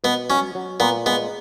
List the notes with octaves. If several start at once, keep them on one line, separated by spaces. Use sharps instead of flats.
B2 B3
F#3 C#4
F#3
A#2 B3
G#3 B3